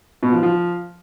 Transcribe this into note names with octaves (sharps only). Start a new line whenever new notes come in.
B2
F3
F3